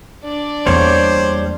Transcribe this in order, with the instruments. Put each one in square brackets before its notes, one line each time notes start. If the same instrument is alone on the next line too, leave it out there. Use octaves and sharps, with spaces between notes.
[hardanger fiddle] D4 D5
[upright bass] E2 A#3 [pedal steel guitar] G3 C#5 C#6 [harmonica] C5